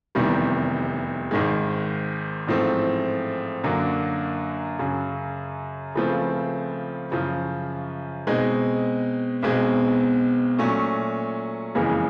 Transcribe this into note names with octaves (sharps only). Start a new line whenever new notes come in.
F1 E2 C3 D#3 G3
G#1 G#2 D#3 G#3
A1 G#2 F3 A3 C4
F#2 D3 F#3 A#3
F#2 C#3 F#3
C#2 C#3 F3 A3 C4
F#2 C#3 F3
B2 G#3 C4 D#4
B1 B2 G#3 C4
A#2 F#3 A3 C#4
F#1 F2 C#3 E3 G#3